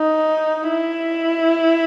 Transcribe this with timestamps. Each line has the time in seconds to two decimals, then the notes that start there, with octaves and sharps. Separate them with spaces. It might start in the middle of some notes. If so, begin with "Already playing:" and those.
Already playing: D#4
0.69 E4